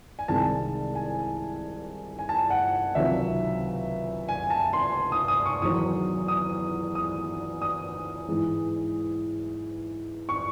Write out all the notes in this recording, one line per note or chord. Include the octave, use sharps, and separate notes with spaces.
G#5
C2 C3 D#3 G#3 A5
G#5
G#5
A5
F#5
C#2 C3 D#3 F#3 E5
G#5
A5
C6
D#6
D#6
C#6
E2 D#3 F#3 D#6
D#6
D#6
D#6
G#2 E3 G#3
C#6